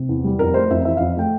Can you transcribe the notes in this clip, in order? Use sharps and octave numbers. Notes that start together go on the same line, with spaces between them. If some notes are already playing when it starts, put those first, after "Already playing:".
Already playing: C3
E2
G3
F2 A#4
A3 C5
F2 E5
E3 E5
F2 F5
A3 G5